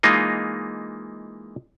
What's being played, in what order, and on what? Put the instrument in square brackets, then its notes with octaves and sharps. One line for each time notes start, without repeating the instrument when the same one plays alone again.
[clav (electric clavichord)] E3 G#3 A#3 D#4 F4